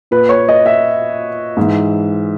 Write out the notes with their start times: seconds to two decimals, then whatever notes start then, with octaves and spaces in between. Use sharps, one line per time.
0.11 A#2 B4
0.29 C#5
0.49 D#5
0.66 E5
1.57 G#2 E3